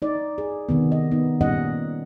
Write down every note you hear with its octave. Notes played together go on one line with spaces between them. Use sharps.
D#4 D5
G#4
C3 D#3 B3
D#5
B3 D#4
A#2 G3 C#4 D#4 D#5 F#5